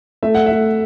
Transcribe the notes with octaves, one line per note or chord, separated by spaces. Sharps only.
A3 E5
F#5
E5
A3